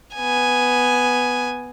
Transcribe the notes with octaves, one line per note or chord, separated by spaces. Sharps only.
B3 G#5